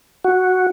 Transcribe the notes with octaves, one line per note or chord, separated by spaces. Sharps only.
F#4